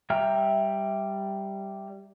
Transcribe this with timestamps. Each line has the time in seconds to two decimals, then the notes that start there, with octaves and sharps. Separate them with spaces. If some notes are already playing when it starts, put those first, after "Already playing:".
0.10 G3 E5 G5 A#5 F6